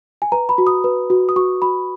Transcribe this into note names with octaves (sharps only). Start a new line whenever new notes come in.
G#5
B4 A#5
B5
F#4
D#6
B4
F#4
D#6
F#4 C#6
F#4 B5